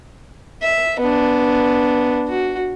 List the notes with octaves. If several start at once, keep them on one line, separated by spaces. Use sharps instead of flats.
E5
B3 D4
F#4